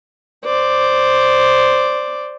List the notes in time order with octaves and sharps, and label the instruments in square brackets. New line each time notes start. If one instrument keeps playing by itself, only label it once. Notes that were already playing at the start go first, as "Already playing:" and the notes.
[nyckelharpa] C5 D5